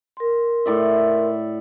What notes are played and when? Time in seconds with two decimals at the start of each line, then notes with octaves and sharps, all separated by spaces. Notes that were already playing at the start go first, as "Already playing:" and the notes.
0.17 A#4 C6
0.66 A2 D5 E5